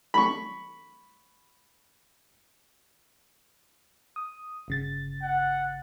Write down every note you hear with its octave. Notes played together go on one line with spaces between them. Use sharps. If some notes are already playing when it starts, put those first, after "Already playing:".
B5 C#6
D#6
G1 C#3 A6
F#5